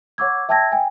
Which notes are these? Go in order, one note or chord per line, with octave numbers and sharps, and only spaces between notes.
C#5 F#5 C#6 D6 E6 G#6
E5 G5 A5 E6 G#6 A#6
G5 G#5